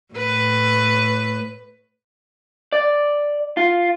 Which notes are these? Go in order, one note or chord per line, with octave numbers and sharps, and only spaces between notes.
A2 B4
D5
F4